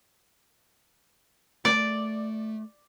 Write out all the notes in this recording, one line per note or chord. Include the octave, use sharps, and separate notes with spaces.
A3 D5